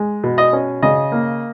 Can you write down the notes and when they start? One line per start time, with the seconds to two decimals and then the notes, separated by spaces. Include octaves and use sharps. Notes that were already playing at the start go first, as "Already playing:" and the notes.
Already playing: G#3
0.24 B2
0.38 D#5
0.53 C#4
0.82 C#3 D#5
1.12 A#3